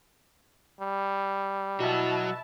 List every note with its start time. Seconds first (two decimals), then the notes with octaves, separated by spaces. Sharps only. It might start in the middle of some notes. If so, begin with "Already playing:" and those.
0.80 G3
1.80 B2 F#3 E4 F#4 E5 A5